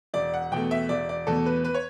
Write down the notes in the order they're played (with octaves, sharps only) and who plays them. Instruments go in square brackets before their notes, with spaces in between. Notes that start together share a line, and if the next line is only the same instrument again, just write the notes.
[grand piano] E1 D5
F#5
E2 B2 A3 G5
E5
E1 D5
D5
E2 B2 A3 A4
B4
B4
C#5